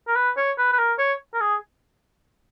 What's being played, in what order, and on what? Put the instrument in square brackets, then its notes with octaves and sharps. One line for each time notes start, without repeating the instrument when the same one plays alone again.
[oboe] A#4
B4
C#5
B4
B4
A#4
C#5
A#4
G#4